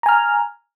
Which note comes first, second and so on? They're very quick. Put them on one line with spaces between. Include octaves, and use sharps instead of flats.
A#5 G#5 F6